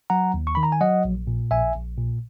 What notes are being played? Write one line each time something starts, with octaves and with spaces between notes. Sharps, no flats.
F#3 F#5 A#5
D#2
C#6
D#3 B5
A#5
G#5
F#3 D#5 F#5
A#1
A#2
A#1 E5 G#5
A#1
A#2